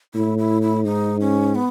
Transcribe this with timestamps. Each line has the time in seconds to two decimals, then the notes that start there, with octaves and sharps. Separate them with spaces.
0.14 A2 E4
0.38 E4
0.62 E4
0.85 G#2 D#4
1.21 C#4
1.55 B3